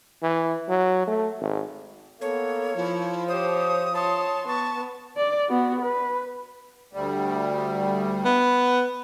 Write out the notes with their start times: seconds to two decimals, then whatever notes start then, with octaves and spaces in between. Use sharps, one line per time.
0.22 E3
0.69 F#3
1.07 A3
1.40 G#1
2.21 A#3 B3 A4 C#5
2.75 F3 E4
3.28 G4 C5 C#5 D#6
3.94 C#5 A5 C6
4.47 B3 A5 C#6
5.17 D5
5.49 B3 F#4
5.81 B4
6.93 D2 G3
8.25 B3